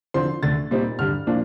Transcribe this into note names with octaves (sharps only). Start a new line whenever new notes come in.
D3 F3 C4 C6
D2 D3 A3 A6
A#2 G3 C4 D#4
G2 D3 G3 F6
A#2 F3 A#3 D4